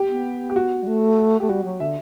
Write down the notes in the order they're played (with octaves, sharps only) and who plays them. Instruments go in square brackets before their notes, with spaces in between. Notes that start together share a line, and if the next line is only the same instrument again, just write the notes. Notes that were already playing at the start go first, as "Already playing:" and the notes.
Already playing: [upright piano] G4
[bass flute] B3
[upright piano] G4
F#4
[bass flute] G3
A3
[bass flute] A3 [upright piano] G4
[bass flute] G3 [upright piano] F#4
[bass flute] F#3
[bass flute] D3 [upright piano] E5